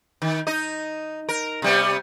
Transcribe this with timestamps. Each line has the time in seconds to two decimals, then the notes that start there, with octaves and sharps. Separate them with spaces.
0.22 D#3
0.47 D#4 D#5
1.29 A#4
1.62 C3 G3 B3